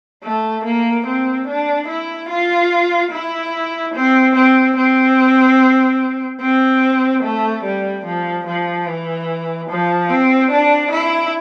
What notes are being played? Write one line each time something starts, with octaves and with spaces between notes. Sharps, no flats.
A3
A#3
C4
D4
E4
F4
E4
C4
C4
C4
C4
A3
G3
F3
F3
E3
F3
C4
D4
E4